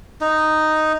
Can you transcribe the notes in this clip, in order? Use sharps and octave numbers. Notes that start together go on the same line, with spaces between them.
D#4